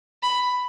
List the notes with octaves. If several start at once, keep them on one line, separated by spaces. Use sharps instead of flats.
B5